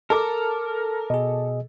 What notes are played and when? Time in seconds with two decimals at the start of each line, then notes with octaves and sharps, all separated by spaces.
0.10 A4 A#4 D6
1.10 B2 G#4 D#5